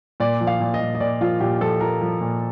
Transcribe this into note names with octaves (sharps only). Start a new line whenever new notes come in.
A#2 D5
F3
F5
A#2
D#5
A#2
D#5
A#2 D5
F3 F4
A#2 G4
F3 A4
F3 A#4
F3
A#2